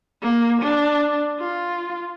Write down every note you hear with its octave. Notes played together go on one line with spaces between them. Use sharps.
A#3
D4
F4